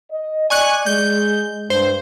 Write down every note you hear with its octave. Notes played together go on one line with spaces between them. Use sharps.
D#5
D5 G#5 C#6 F#6
G#3 G6
G2 C5